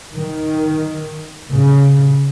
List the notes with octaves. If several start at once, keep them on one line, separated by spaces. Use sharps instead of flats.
D#3
C#3